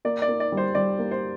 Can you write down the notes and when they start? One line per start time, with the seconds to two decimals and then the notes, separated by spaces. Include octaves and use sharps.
0.05 A#3 D5
0.22 D5
0.28 A#3
0.40 D5
0.52 G3
0.57 C5
0.75 G3 D5
0.99 A#3
1.11 C5